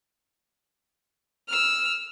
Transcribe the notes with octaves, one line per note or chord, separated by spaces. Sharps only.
E6 F6